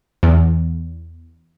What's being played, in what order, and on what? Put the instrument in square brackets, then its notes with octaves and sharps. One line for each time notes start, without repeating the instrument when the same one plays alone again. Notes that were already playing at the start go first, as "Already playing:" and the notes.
[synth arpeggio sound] E2